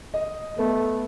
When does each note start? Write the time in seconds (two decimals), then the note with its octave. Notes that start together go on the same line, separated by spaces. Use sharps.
0.14 D#5
0.58 A3 B3